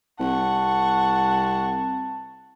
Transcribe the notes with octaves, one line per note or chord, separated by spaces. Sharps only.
C2 F#5 A5 C#6